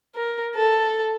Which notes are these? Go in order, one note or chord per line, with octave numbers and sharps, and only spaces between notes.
A#4
A4